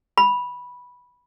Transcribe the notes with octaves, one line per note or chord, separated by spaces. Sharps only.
B5